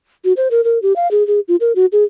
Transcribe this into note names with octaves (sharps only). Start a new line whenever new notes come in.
F#4
C5
A#4
A#4
G4
F5
G#4
G#4
F4
A#4
F#4
G#4